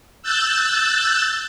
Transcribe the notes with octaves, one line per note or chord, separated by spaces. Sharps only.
E6 F#6 G6 A6